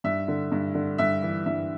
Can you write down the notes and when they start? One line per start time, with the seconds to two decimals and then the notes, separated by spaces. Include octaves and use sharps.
0.04 G2 E5
0.28 D3
0.52 G2
0.75 D3
0.98 G2 E5
1.22 E3
1.46 G2 E5